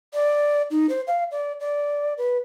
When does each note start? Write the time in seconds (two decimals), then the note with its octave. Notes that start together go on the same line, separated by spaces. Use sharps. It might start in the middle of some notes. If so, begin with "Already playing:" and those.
0.14 D5
0.71 D#4
0.89 C5
1.07 F5
1.31 D5
1.60 D5
2.18 B4